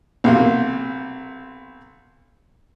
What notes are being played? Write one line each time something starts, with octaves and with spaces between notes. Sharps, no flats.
B1 C3 A#3